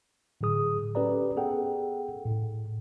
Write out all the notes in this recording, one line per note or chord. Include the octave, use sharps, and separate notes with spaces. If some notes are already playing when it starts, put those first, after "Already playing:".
A2 D3 F#3 G#4 D#6
C#4 G4 A4 B4 D5 A#5
B3 G#4 A4 F#5 G5
A2